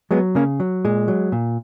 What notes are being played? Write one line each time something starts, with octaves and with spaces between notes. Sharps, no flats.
F#3 G#3 B3
C#3 A#3 C#4
F#3
A#2 G#3
F#3
A#2